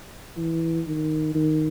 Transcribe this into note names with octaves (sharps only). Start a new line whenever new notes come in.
E3
D#3
D#3